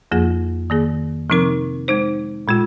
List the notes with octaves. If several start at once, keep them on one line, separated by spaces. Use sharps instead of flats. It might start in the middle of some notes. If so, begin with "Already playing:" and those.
F2 F3 A#3 F4 G#4
D#3 A#3 G#4
C3 F3 C4 D#4 A#4
G#3 D#4 C5
A#2 G#3 F4